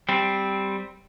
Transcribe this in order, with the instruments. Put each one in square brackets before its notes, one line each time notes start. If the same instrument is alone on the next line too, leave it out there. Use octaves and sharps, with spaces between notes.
[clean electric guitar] G3 C4